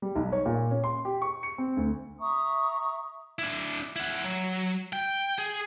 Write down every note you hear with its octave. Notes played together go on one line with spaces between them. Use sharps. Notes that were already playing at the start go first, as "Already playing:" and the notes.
G3
B1
C#5
A#2
C#4
C6
G4
C#6
C#7
C4
D2
E5 A#5 C#6 D#6
D4 E4
E4 F#5
F#3
G5
G#4